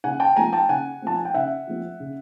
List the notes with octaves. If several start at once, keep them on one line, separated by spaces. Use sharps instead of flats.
C#3 F#5 G#5
G5 A5
F3 A3 C4 G#5 A#5
G5 A5
C#3 F#5 G#5
F3 A3 C4 A5
G#5
G5
C#3 E5 F#5
F3 A3 C4
C#3